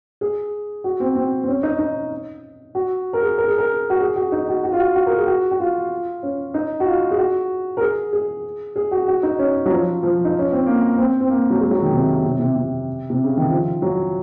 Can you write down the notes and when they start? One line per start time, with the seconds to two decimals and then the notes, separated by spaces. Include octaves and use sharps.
0.21 G#4
0.84 F#4
1.00 C4
1.16 C4
1.44 C4
1.48 C#4
1.63 D#4
1.79 D#4
2.75 F#4
3.13 A#4
3.22 G#4
3.38 A#4
3.48 G#4
3.58 A#4
3.90 F#4
4.00 G#4
4.16 F#4
4.32 D#4
4.49 F#4
4.64 F#4
4.72 F4
4.80 F#4
4.95 F#4
5.06 A#4
5.18 G#4
5.27 F#4
5.51 F#4
5.60 F4
6.23 C#4
6.54 D#4
6.80 F#4
6.86 F4
7.11 G#4
7.18 F#4
7.77 A#4
7.81 G#4
8.13 G#4
8.76 G#4
8.91 F#4
9.08 F#4
9.23 D#4
9.39 C#4
9.66 F#3
9.71 F3
10.03 F3
10.25 D#4
10.39 C#4
10.52 C4
10.66 A#3
10.98 C4
11.21 C4
11.30 A#3
11.50 F#3
11.60 G#3
11.71 F#3
11.82 D#3
11.92 C3
12.24 C3
12.39 C3
12.56 C3
13.10 C3
13.24 C#3
13.37 D#3
13.50 F3
13.82 F#3